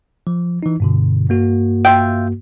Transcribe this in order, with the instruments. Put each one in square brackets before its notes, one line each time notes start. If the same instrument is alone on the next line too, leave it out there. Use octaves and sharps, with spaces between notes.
[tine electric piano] F3
E3 D#4
G2 B2 D3
G2 A#3 F#4
[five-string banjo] F4 E5 G5